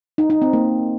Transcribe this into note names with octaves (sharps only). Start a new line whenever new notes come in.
D#4
D#4
C4
A#3